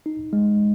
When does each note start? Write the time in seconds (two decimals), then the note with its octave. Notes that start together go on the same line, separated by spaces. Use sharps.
0.06 D#4
0.33 G#3